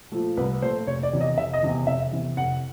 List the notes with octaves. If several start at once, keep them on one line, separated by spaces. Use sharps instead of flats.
A#2 F3 A3
C2 B4
A#2 F3 A3 C5
F1 C#5
D5
E2 C3 E3
D#5
F1 E5
D#5
E2 C3 E3
F1 E5
E2 C3 E3
F1 F#5